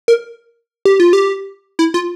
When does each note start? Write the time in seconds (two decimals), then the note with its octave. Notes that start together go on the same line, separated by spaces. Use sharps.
0.08 A#4
0.85 G4
1.00 F4
1.13 G4
1.79 E4
1.94 F4